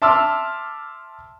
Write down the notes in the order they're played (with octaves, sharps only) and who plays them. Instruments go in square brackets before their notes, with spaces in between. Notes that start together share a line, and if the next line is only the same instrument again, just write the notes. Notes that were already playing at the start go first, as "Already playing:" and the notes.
[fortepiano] E5 A5 C6 D6 E6 F6